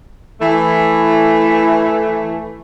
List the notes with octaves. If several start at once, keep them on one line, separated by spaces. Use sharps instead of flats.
E3 A3